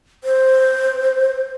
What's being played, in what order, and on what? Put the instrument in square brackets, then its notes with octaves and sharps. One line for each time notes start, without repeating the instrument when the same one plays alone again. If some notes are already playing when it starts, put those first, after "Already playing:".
[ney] C5